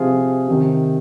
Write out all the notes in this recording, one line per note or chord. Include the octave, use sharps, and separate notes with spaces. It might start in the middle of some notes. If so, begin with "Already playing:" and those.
Already playing: C3 F3 F4 G#4
C3 D#3